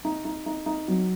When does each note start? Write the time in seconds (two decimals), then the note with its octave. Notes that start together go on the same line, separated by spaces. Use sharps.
0.05 D#4
0.25 D#4
0.46 D#4
0.66 D#4
0.88 F#3